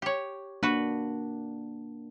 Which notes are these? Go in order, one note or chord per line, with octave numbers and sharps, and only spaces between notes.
G4 C#5
A#3 D4 F#4 B4